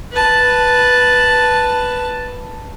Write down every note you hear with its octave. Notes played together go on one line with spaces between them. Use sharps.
B4 A5